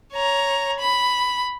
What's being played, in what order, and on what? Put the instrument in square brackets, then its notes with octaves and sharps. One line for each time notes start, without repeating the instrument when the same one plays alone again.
[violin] C#5 A#5
B5